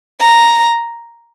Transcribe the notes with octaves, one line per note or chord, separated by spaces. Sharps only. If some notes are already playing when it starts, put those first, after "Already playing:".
A#5